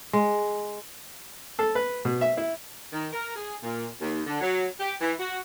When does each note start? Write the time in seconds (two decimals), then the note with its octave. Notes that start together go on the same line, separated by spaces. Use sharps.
0.13 G#3
1.59 A4
1.75 B4
2.05 B2
2.21 E5
2.37 E4
2.93 D#3
3.13 A#4
3.36 G#4
3.63 A#2
4.01 D#2
4.27 D3
4.41 F#3
4.80 G4
5.01 E3
5.20 F#4